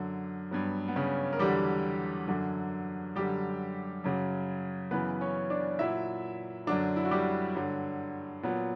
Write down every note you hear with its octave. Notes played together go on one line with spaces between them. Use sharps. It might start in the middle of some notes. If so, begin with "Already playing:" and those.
Already playing: F#2 D3 F#3
G2 F#3 B3
B3
C#3 C#4
A#4
E2 D3 F#3 G3 G4
F#2 D3 F#3
F#2 D3 F#3 G3 G4
F#2 C#3 F#3
F#2 C#3 E3 B3 B4
C#4 C#5
D4 D5
A#2 F#3 E4 E5
F#2 D3 F#3 D4 D5
E4
F#4
G3 G4
G2 D3 F#3
A#2 F#3 B3